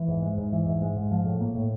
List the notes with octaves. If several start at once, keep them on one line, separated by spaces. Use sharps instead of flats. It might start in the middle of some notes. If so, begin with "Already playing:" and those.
Already playing: E3
G#2
G#3
G#2
E3
G#2
G#3
G#2
F3
A2
A#3
A2